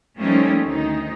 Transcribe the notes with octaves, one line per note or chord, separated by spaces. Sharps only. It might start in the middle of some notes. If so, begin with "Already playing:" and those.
F3 G3 A3 A#3 C#4 D#4
D2 D#3 D#4